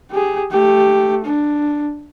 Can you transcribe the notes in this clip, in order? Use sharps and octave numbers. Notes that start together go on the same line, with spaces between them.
G4 G#4
A3 G4
D4